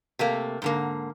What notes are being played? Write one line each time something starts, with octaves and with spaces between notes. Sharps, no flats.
C3 A3 A#3
G#2 D3 A#3